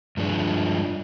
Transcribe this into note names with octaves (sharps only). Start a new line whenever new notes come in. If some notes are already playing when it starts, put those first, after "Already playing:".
G2 F3 G#3 D4